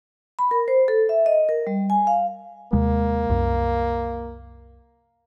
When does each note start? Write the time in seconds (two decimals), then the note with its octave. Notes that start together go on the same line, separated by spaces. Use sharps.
0.39 B5
0.51 A#4
0.68 C5
0.88 A4
1.09 E5
1.26 D#5
1.49 A#4
1.67 G3
1.90 G#5
2.07 F5
2.73 D#2 C3 G#3 A#3
3.29 C2 F#2